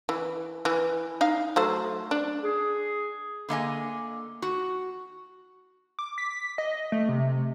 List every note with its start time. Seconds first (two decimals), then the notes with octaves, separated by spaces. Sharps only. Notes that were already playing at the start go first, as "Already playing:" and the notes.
0.09 E3
0.65 E3
1.21 D#4 F5
1.56 F#3 A3 C5
2.11 D4
2.42 G#4
3.49 D3 A#3 D#5 G#5
4.42 F#4
5.99 D6
6.18 B6
6.58 D#5
6.92 A3
7.09 C3